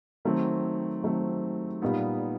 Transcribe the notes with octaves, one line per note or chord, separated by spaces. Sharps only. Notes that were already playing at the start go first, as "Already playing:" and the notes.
D#3 F#3 A3 C4
D#3 F#3 A3 C4
A#2 G3 B3 D#4